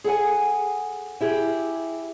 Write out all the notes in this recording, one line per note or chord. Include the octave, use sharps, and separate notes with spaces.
G#4 A4 F#5 G#5
E4 G4 G#4